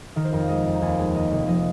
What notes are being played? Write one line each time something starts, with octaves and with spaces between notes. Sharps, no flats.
D#3 A#4
C5
F2 A#4
G#3 D#5
F2
A#5
D#2 G#5
G#3
D#3 D#5
F1
F3 D#5